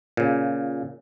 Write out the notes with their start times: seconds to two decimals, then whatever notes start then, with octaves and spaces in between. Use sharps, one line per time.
0.17 A#2 C#3